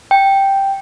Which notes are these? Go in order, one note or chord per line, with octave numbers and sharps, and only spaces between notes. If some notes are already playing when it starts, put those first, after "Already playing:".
G5